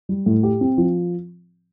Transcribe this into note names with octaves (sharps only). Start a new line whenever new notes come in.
G3
A2
G4
C4
F3